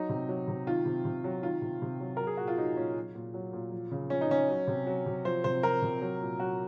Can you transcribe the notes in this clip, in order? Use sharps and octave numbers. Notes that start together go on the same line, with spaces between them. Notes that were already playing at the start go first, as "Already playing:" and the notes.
Already playing: F#3 D#4
C3
F#3
C3
D#3 F4
C3
C3
F#3
D#3 F4
C3
C3
F#3
F#3 A#4
G#4
A#2 F#4
F4
F#3 D#4
A#2 C#4
F#3
A#2
F#3
A#2
F3
C#3
F3 C#4
D#4
C#3 C#4
F#3
C3
F#3
C3
F3 C5
C3 C5
F3 A#4
C3
F#3
A#2
F#3 F#4